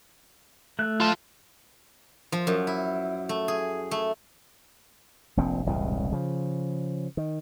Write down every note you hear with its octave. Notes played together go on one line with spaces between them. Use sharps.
A3 F#6
F4 A5
F3
F#2
E4
A3
G#4
A3
F1 A#1 A#2 C4
E1 C2 A2 C#3
C#3 F3
D#3